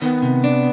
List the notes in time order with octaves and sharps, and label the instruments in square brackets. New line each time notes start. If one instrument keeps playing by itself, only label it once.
[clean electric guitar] D#3 [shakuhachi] B3
[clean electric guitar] C3
D4